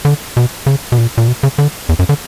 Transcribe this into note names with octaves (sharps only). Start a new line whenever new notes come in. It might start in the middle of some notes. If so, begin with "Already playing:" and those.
D3
B2
C#3
B2
A#2
A#2
B2
C#3
D3
E2
F#2
D3